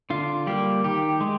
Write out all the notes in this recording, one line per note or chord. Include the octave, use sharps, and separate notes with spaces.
D3 F4
G3 A#3 G4
D#3 G4
G#3